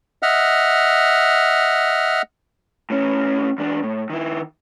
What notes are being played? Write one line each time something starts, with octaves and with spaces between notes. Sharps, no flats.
D#5 E5 F#5 F6
A2 C#4
E2 D4
A2
D#3 E4